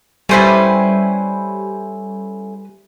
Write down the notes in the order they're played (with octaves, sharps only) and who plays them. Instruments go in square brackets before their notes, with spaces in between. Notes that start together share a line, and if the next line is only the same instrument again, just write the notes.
[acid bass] G3 [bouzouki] A3 C#4 E4 [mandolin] B4 C5 G#5